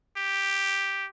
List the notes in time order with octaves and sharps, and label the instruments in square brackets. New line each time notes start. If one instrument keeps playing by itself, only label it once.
[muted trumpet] G4